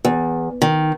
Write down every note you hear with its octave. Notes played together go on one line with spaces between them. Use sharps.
E2
D#3